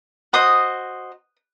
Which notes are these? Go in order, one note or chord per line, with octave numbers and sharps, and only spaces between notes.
F#4 C5 D#5 D#6